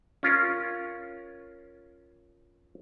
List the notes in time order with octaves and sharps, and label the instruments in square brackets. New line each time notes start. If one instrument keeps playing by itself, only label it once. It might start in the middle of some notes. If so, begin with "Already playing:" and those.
[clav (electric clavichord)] C#4 F4 A#4